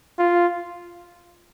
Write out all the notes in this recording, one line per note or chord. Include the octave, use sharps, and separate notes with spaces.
F4